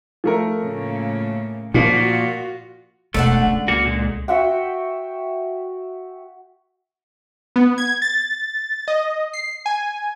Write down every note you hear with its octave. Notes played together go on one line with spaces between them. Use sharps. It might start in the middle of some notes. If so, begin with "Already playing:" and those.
F3 A3 A#4
A2 C#3 A#3
A#2 F3 F4 F#4
E1 D3 A3 A#3 D5 F#5
C#2
A#3 F#4
A#2 G#3
F#4 E5 F#5 G5
B3
G#6
A6
D#5
C7
G#5